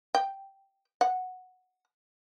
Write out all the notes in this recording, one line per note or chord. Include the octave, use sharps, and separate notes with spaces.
G5
F#5